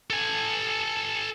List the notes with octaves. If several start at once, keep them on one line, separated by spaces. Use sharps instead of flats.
A4 G#5